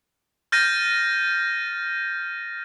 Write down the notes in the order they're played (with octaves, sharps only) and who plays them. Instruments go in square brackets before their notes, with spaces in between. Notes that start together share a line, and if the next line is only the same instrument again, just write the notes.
[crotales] F6 G6 A6 A#6 D#7